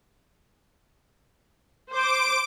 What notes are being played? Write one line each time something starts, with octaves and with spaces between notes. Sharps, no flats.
C5 D6 D7